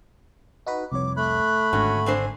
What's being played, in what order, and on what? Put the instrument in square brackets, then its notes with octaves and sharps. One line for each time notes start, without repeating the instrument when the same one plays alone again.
[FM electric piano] D#4 F#4 B4
[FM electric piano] C2 F2 C#5 [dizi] D6
[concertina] A3 B5 [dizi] F#6
[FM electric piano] G#1 D3 [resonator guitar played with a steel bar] C#4 F#4
[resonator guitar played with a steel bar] C4 D4 C5 [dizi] G#5